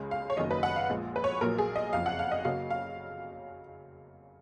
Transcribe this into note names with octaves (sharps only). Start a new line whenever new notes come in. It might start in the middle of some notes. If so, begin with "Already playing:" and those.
Already playing: C#2 C#3 G#3
F5
C#5
F#1 F#2 D#3 F#3 A#3 D#5
B4
F#5
F5
A#1 A#2 F3 G#3
B4
C#5
A#1 A#2 F#3 A#4
G#4
D#5
F#1 F2 F3 F5
F#5
F5
D#5
F#2 C#3 F#3 A#3 F5
F5